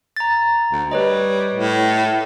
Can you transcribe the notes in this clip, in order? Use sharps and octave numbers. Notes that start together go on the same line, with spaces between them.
A#5 A6
D2
G3 B4 C#5 D#5
A2